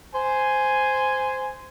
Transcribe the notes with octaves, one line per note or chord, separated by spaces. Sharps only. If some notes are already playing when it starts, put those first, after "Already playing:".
C5 G#5